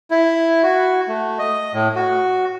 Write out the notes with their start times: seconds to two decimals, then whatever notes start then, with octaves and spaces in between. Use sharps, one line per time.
0.11 E4
0.63 F#4
1.08 A3
1.39 D#5
1.73 A2
1.95 F#4